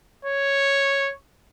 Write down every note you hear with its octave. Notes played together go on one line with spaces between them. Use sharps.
C#5